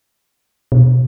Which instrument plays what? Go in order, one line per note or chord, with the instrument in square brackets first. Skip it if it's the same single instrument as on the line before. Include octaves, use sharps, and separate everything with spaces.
[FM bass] B2